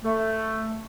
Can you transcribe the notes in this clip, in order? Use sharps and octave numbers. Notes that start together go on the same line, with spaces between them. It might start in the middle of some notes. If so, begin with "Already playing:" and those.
A3